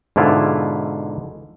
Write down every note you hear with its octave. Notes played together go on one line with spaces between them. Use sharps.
G#2 B2 D3 E4 F4